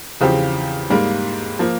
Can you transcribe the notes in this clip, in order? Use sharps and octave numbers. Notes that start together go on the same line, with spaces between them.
E2 C#3 F3 C4 G4
G#2 G3 A#3
F3 A#3